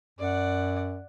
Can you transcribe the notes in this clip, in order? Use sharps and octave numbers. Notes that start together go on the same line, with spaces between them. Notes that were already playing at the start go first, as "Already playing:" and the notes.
F#2 D5 F#5